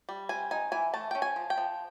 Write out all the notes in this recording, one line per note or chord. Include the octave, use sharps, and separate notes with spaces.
G3
C4 G#5
D#4 G#5
E3 G#5
A3 A5
C#4 G5
G#5
F3
G5
F3